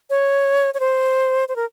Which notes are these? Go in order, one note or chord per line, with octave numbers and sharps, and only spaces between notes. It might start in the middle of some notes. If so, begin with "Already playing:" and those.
C#5
C#5
C5
C5
A#4